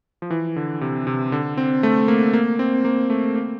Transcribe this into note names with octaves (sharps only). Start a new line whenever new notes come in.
F3
E3
D3
C3
C3
D3
C4
A3
A#3
A#3
C4
A#3
A3
A#3